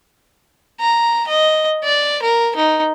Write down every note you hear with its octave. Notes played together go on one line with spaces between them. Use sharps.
A#5
D#5
D5
A#4
D#4